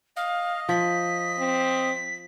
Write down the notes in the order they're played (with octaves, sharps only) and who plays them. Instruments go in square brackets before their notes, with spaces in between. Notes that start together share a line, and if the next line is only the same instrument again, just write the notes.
[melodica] D#5 [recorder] F5
[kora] F3 [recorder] B6
[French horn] C4